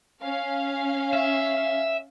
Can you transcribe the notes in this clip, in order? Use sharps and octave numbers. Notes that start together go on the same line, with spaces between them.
C#4 F5
E5